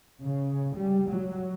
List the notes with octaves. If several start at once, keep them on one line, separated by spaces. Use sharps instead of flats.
C#3
G3
F#3